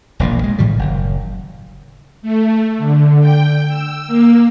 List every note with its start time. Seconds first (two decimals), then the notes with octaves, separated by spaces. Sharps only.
0.20 E1 A#1 A#2
0.43 G#3
0.58 A2 D#3 F3 G3
0.79 F#1
2.22 A3
2.78 D3
3.21 G5
3.68 E6
4.07 A#3